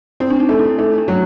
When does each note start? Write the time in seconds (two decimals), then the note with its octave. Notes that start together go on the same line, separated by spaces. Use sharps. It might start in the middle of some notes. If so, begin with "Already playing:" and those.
0.20 C4 E4
0.30 D4
0.40 D#4
0.49 A3
0.59 E4
0.78 A3 D#4
0.98 D4
1.08 F#3